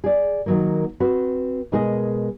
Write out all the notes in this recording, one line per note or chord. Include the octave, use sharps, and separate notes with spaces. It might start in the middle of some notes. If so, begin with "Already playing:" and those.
G#4 D5
D#3 F#3 A#3
C4 F#4 B4
B2 G#3 G#4 A#4 B4 D#5